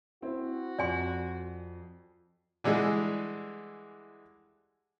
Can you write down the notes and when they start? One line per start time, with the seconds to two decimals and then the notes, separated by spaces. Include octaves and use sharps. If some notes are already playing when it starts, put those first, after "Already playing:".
0.22 C4 E4 F#4
0.79 F2 D5 G#5 C6
2.64 D3 E3 G3 G#3 G#4